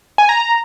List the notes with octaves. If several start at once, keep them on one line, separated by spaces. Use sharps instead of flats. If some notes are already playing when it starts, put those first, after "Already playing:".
G#5
A#5